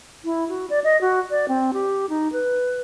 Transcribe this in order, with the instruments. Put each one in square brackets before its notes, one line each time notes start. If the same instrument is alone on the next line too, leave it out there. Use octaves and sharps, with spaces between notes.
[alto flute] E4
F#4
D5
D#5
F#4
D5
C4
G4
D#4
B4